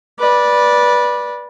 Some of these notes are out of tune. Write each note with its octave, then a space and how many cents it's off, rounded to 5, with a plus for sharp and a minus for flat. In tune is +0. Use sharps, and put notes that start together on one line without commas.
B4 -20 D5 +0